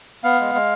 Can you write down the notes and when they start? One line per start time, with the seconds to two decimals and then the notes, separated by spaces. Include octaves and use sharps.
0.24 B3 F5
0.40 G#3
0.55 G#3